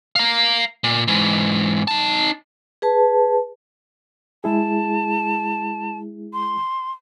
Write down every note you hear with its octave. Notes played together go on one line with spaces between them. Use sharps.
F5 A#5
A#2
G#2 E3
D#4 A5
G#4 B4 A5
G#3 E4 G#4 A5
C6